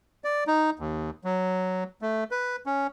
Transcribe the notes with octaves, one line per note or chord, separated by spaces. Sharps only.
D5
D#4
D#2
F#3
A3
B4
C#4